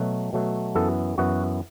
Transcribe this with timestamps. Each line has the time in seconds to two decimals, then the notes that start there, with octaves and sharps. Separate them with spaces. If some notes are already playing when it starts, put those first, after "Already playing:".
Already playing: B2 F#3 A3
0.33 B2 F#3 A3
0.75 F#2 E3 B3 A4
1.18 F#2 E3 B3 F#4